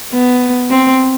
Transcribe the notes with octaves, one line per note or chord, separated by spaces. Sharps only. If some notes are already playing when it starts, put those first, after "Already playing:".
B3
C4